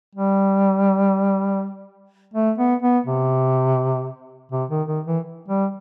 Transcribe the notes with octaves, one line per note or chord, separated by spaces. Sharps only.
G3
A3
B3
B3
C3
C3
D#3
D#3
E3
G3